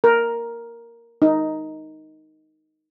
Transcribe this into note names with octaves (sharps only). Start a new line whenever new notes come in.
A#4
D#4